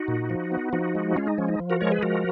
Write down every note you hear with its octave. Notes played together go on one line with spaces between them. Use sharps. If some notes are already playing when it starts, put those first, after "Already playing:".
Already playing: D#4 F#4
A#2
F3
B3
F3 D#4 F#4
G#3
G#3 C#4 F4
D#4
F3 C#4
D#4
F3
F#4 A#4
G#3 A#4 C#5
G#4 B4
F3 F#4 A#4